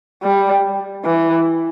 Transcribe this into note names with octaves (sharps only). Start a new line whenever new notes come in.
G3
E3